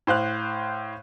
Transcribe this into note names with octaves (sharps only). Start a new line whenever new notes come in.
A2 C5 F5 F#6